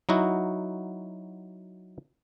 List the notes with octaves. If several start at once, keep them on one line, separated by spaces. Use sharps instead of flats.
F#3 D#4 E4 F#4